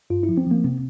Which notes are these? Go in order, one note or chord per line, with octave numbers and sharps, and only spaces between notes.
G2 F4
E4
F3
C4
F3 A#3
C3 C4